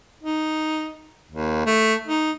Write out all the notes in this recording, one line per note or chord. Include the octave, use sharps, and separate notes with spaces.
D#4
D#2
A3
D#4